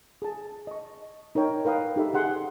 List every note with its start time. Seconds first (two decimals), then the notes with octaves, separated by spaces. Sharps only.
0.22 G#4 A5
0.67 D#5 C#6
1.35 D#4 A#4 C#5 G5
1.65 A#4 B4 F5 G5 D#6
1.96 D#4 G4 A4 E5 B5
2.13 G4 G#4 F#5 C6